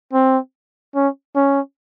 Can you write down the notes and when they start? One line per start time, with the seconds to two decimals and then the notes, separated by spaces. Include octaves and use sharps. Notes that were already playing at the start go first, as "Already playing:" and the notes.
0.13 C4
0.95 C#4
1.35 C#4